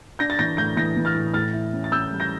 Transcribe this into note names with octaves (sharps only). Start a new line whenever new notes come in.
D4 G6 A#6
A6
E3 G6 A#6
A2 G6 A#6
E3 G6 A#6
E3
F6 A6
A2
A2 F6 A6
E4
C#4
A6
C#4 E6 G6
G3
G6 A#6